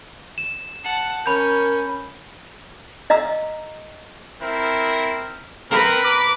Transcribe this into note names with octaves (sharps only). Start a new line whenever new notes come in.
E7
F#5 A5
C#4 A#4 B5 G6
D#5 F5 A#5 E6
C4 E4 A#4
C4 A#4 B4
A#5 D6